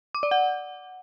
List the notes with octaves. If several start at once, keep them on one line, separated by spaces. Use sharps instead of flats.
D6
D5
F#5